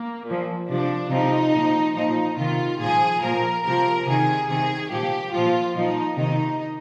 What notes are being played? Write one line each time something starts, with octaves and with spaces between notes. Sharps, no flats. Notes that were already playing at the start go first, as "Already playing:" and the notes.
Already playing: A#3
A#2 F3
C3 F3 D4
C3 F3 D#4
A#2 F3
A#2 F3 D#4
C3 D#3 F4
A#2 F3 G#4
A#2 F3 A#4
C3 F3 A#4
C3 D#3 G#4
C3 D#3 G#4
A#2 F3 G4
A#2 F3 F4
A#2 F3 D#4
C3 D#3 D#4